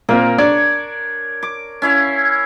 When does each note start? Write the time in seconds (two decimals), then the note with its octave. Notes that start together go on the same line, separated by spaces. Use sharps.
0.09 A#2 A#3 C4 A#4
0.38 D4 C#5 D5
1.43 D6
1.82 C#4 E4 F5